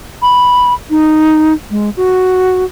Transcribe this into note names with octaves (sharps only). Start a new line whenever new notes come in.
B5
D#4
G#3
F#4